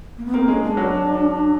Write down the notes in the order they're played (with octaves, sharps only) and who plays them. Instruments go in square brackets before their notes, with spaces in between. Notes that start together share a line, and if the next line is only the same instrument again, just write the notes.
[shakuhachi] A#3
B3
[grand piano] A#3 [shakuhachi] C4
[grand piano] G#3 [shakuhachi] C#4
[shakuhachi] D4
[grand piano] F#3